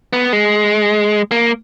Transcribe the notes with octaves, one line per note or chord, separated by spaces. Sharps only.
B3
G#3
A#3